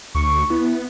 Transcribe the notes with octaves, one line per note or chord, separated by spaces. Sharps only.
D2 C#6
B3 E4